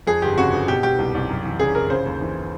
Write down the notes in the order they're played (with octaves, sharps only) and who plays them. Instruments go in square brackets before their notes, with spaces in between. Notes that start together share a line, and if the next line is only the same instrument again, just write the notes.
[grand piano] F2 G#4
G1 G4
C#3 F#4
G1
B2 G4
B2 G4
C2
C2
F#2
E3
C#3 G#4
G1 A#4
C#3 C5
D#2
E3